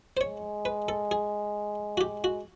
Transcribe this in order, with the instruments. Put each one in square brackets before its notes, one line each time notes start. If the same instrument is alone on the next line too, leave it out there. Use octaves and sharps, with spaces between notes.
[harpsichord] C5
[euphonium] G#3 [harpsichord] C#5
[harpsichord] B4
A4
G#4
F#4
[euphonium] G#3 [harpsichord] G4
[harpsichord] F#4